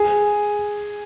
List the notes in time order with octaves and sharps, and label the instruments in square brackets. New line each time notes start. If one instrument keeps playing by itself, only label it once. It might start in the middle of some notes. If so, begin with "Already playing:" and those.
Already playing: [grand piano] G#4